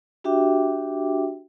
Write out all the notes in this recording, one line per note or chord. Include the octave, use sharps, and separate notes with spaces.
D4 F#4 G4 E5 G5 D6